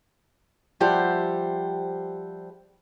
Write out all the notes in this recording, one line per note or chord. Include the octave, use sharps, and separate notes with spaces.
F3 G3 G4 C5 E5 F#5